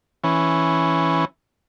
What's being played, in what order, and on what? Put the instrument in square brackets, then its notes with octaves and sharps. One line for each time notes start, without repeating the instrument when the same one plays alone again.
[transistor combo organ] E3 C#4